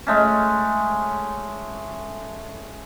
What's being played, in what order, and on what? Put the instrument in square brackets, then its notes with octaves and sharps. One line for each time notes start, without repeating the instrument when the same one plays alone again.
[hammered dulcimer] G#3 A3 C#4